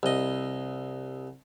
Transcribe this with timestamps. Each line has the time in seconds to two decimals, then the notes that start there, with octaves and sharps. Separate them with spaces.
0.03 C2 D#5